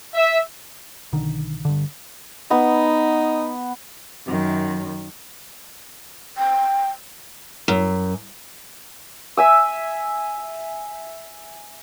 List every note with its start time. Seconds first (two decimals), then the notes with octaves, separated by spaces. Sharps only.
0.15 E5
1.13 B1 D3 D#3
1.65 G2 D3
2.51 B3 D#4
4.26 F#2 D#3
6.38 G5
7.68 F#2
9.37 E5 G#5 E6